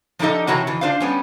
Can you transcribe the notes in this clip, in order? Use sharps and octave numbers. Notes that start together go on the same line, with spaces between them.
F3 D4 D#4 G4 A4 D#5
C3 E3 F#4 C#5 A5 A#5
F2 E3
D4 F4 C5 D5 F5
G3 B3 C#4